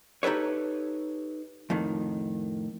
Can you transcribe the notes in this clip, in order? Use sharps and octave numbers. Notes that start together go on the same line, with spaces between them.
D#4 G4 A4 B4 C#5
F2 A2 D#3